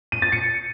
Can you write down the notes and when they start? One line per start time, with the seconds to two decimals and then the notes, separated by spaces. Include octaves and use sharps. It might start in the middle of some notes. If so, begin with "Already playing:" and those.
0.12 D#7
0.22 A6
0.32 C#7